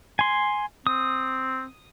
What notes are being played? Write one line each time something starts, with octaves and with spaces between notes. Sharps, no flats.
G#5 C6
C4 D#6